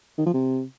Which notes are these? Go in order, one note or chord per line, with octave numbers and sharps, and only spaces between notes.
D#3
F3
C3